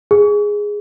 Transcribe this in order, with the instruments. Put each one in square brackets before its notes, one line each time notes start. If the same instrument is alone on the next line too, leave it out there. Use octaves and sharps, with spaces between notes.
[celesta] G#4